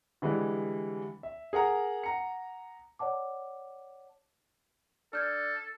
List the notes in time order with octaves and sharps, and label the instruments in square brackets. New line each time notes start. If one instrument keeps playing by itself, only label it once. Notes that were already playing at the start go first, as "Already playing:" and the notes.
[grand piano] D3 E3 G3 G#3
E5
G#4 A#4 F#5 A#5
F#5 A#5 C#7
[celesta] C#5 D5 F#5 A5 D6
[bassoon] D4 [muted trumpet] A4 [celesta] F6 G6 G#6